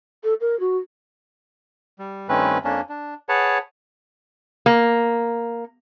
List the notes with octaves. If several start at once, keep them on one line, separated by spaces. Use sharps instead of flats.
A4
A#4
F#4
G3
G2 D#3 A3 C4 C#4 B4
F2 A#3 C#4 D4
D4
G#4 B4 C#5 F#5 A5
A#3